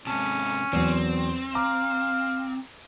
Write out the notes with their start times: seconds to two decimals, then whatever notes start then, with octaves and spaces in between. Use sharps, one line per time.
0.07 G#2 C3 C#4 A5
0.73 E2 F#3 C4
1.55 F5 A#5 D6